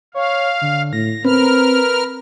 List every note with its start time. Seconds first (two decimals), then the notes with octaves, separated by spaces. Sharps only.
0.14 C#5 F5
0.62 D3
0.93 A2 A#6
1.25 C4 A#4 B4 F6